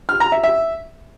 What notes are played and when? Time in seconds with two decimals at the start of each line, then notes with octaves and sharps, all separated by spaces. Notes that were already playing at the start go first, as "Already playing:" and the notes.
0.09 F6
0.20 A#5
0.32 E5
0.43 E5